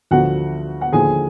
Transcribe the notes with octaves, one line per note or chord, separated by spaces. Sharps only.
D2 D3 F3 F#4 F#5
F#5
D#2 D3 F3 G#4 G#5